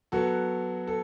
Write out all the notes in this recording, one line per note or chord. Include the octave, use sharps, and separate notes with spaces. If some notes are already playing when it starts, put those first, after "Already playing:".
F#3 B3 F#4 A4
A4